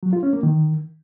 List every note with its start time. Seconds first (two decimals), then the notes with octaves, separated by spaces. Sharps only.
0.03 F#3
0.13 F4
0.23 C#4
0.33 A#3
0.43 D#3